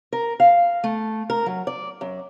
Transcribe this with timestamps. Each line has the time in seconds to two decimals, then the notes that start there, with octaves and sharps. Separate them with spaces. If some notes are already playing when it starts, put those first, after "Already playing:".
0.13 A#4
0.40 F5
0.84 A3
1.30 A#4
1.46 F#3
1.67 D5
2.01 F#2